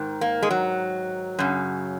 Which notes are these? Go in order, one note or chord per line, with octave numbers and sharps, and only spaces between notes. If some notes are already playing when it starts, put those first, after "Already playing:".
Already playing: G#2 D#3
A#3
G#3
F#3
F#2 C#3